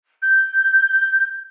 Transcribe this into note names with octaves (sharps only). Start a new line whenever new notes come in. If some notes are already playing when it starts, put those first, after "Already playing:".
G6